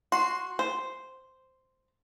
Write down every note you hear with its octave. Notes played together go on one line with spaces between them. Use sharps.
F#4 C6
C5